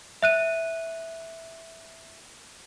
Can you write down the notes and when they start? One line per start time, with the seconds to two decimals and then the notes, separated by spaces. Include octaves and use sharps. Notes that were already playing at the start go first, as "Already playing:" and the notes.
0.22 E5 F#6 D#7